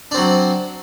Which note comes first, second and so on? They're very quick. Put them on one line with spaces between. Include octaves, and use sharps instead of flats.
D4 C4 F#3